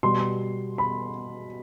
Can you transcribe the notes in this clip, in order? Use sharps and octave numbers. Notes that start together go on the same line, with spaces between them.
B2 G3 C6
B5